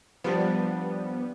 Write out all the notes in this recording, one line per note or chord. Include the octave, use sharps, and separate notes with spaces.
F3 G3 B3 D4